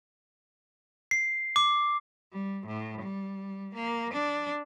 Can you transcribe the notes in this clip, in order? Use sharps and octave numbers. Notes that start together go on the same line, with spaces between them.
C7
D6
G3
A2
G3
A#3
D4